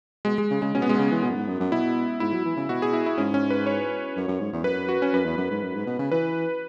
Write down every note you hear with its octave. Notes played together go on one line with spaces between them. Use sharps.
B2 G#3
G#3
C#3
C#3 G#3
B2 C#4
B3
B2 G#3
C#3 B3
E3
B2
F#2
G#2
F#2
F#2
B2 E4
G#2 E4
F#3
E3
C#3
B2 F#4
G#4
E4
E4
G#2 C#4
C#4
B4
C#5
F#2
F#2
G#2
E2
F#2 B4
F#4
C#4
F#2 B4
E2
F#2
G#2
F#2
G#2
B2
C#3
E3 B4